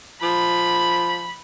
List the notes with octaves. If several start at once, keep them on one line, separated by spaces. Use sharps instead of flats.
F3 B5